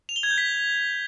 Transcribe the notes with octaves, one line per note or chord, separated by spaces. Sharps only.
F7
G7
G#6
G6
B6